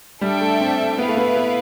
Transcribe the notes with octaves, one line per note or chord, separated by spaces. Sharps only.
G3 D4 A4 E5 G5
A3
C4
B3 E4 B4 F5
A3
B3
B3